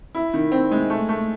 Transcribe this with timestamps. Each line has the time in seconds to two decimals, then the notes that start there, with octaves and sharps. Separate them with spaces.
0.15 E4
0.34 D#3
0.52 C4
0.71 G#3
0.90 A3
1.09 A3